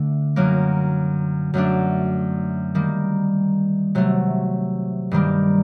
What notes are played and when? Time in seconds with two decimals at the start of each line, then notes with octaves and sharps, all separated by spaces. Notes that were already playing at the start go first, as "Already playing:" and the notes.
Already playing: D3 A3 D4
0.36 F#2 F#3 A#3
1.54 F#2 F#3 A3 D4
2.75 D#3 G3 A#3
3.95 C3 F#3 A3
5.11 G2 D#3 G3 A#3